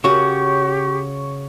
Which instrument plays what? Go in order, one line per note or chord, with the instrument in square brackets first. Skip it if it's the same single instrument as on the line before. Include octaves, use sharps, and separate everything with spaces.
[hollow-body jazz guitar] C#3 F#4 [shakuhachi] G4 [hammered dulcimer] C#5